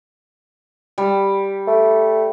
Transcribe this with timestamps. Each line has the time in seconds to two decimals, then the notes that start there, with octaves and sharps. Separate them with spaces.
0.98 G3
1.67 A3